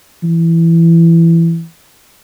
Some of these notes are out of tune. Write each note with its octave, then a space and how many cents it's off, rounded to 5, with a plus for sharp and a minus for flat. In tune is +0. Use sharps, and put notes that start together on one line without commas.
E3 +15